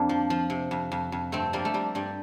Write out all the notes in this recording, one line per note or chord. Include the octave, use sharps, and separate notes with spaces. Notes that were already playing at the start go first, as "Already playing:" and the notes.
Already playing: F2 A#3 C4 D4
F3
F3
C3
F2
F2
F2
G2 A3 C4
F3 G3 A#3
A3
F3 G3
G2 G3